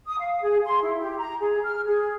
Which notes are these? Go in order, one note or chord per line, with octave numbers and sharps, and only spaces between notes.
D#6
F5
G#4
C6
E4
G4
A#5
G#4
F6
G#4